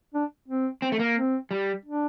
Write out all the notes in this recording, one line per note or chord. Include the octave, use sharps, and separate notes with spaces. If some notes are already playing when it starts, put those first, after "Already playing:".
D4
C4
C4
A3
A#3
C4
G3
D4